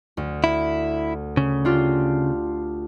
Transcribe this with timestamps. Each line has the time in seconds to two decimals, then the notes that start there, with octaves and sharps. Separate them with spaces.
0.17 D2
0.44 E4
1.37 C#3
1.65 D4 F4 G4